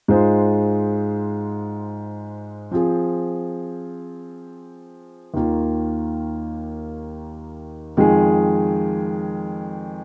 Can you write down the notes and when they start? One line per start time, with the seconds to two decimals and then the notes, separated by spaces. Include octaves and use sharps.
0.08 G#2 G#3 F4 G#4 C5
2.72 F3 C4 F4 G#4
5.34 D#2 D#3 A#3 F4
7.97 F2 D#3 G#3 F4 G#4